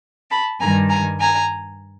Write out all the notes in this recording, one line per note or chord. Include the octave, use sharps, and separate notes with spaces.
A5 B5
G2 D#3 G3 G#5 A#5
G#5 A#5
G#5 A#5